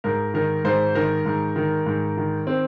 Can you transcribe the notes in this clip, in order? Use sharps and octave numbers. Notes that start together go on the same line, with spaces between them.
G#2 A#4
D#3 A#4
G#2 C5
D#3 A#4
G#2
D#3
G#2
D#3
C4